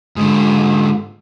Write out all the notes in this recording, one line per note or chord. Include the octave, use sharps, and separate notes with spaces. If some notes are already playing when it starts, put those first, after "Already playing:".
G#2 D3